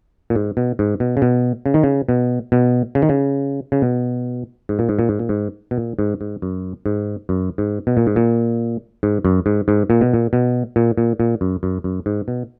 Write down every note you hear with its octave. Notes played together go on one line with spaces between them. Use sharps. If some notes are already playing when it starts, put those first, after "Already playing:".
A#2
G#2
B2
G#2
B2
C#3
B2
C#3
D#3
C#3
B2
B2
C#3
D#3
C#3
C#3
B2
G#2
A#2
G#2
A#2
G#2
A#2
G#2
B2
A#2
G#2
G#2
F#2
G#2
F#2
G#2
B2
A#2
G#2
A#2
G#2
F#2
G#2
G#2
A#2
B2
A#2
B2
A#2
A#2
A#2
F#2
F#2
F#2
G#2
B2